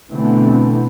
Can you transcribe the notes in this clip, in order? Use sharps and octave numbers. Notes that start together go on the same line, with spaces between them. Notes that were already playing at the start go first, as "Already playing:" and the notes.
B2 D3 E3 A3 B3 C4